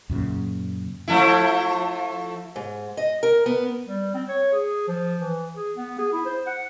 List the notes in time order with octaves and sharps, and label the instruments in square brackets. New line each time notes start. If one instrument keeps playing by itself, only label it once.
[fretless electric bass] F#2 A#2 C#3
[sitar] F3 A3 E4
[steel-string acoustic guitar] G#2
D#5
A#4
B3
[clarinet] G3
C4
C#5
G#4
F3
E3
G#4
B3
G#4
E4
C5
F#5